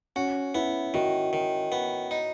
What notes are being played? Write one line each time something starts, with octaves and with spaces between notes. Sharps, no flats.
C#4 F#4
B3 E4
D#3 F#4
D#3
B3
D#4